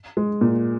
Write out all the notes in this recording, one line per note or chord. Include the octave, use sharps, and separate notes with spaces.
G#3
A#2